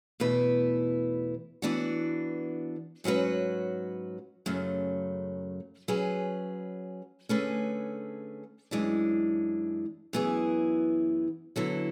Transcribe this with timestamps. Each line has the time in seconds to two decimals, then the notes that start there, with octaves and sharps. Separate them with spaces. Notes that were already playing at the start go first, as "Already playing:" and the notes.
0.20 E2 B2 A3 E4 B4
1.62 E3 B3 D4 F#4
3.04 G#2 F#3 C#4 F#4 B4
4.46 F#2 C#3 F#3 A3
5.88 F#3 C#4 G#4 B4
7.29 D3 A3 C#4 G#4 B4
8.71 F#2 E3 G#3 D4
10.13 F#2 E3 B3 E4 G#4
11.56 D3 F#3 B3 E4 A4